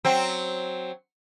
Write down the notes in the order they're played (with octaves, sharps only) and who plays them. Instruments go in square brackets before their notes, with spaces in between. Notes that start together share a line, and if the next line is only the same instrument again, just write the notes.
[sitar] F#3 C4